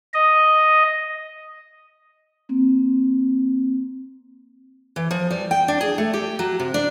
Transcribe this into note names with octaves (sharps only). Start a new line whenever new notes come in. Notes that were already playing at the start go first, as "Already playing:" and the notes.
D#5
A#3 C4
E3
F3
G3
G5
D4
G#4
A3
G4
F#3
C3
D4